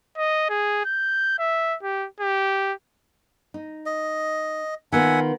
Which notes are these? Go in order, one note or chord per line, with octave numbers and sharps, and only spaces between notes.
D#5
G#4
G6
E5
G4
G4
D#4
D#5
D#3 B3 F4 E5 F#5 G#5